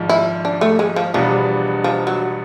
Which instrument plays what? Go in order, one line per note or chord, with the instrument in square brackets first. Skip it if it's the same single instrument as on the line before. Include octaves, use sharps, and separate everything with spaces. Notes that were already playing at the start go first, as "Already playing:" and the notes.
Already playing: [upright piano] G#1 G#2 F3
[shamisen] E4
D4
A3
G#3
F3
[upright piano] E2 B2 G3 B3 D4 [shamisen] F3
[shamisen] F3
F#3